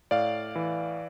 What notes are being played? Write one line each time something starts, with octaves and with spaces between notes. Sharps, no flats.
A2 D5 F5
E3